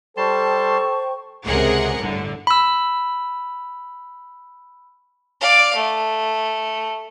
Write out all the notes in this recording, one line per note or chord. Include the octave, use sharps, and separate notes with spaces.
G3 A4 C5 G5 A5 C6 C#6
C#2 C3 G#4 A#4 F#5
G1 A2 D3
B5 E6
D5 F5
A3